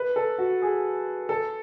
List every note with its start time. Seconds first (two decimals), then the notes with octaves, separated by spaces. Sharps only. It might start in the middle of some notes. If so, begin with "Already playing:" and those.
Already playing: B4
0.16 A4
0.38 F#4
0.62 G#4
1.29 A4